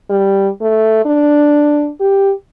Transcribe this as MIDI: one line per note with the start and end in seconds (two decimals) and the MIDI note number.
0.10 0.49 55
0.61 1.05 57
1.06 1.90 62
2.00 2.33 67